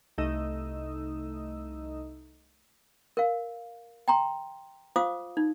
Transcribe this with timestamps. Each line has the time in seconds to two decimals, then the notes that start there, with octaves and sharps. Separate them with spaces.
0.18 C2 A3 D#4 D#6 E6
3.17 A#4 F5
4.08 G5 A#5 C6
4.96 F4 C5 F5 D6 D#6
5.37 D#4